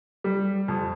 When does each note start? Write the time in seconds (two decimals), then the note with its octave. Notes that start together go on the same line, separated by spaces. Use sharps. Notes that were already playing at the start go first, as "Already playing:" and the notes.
0.24 G3
0.68 F2